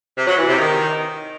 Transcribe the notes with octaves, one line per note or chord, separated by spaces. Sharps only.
C3
F#3
E3
C3
D#3